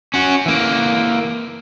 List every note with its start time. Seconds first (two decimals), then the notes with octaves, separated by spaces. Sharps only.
0.14 C#4 F#4
0.46 E3 A#3